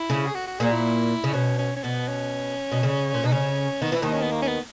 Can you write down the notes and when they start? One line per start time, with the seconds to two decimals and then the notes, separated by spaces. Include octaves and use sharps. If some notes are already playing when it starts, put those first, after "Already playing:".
Already playing: E4
0.10 C#3
0.27 G#4
0.35 F#4
0.47 F#4
0.59 A#2 G#4
0.72 E4
1.24 C#3
1.34 B2 C#4
1.59 C#4
1.76 C#4
1.83 B2 B3
2.08 C#4
2.72 B2
2.83 C#3
3.14 A#2
3.24 B2 D#4
3.32 C#3 C#4
3.82 D#3 B3
3.92 E3 E4
4.02 D#2 D#3 D#4
4.13 C#4
4.22 B3
4.31 A#3
4.42 C#4
4.48 B3